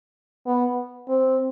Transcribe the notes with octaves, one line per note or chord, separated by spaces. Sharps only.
B3
C4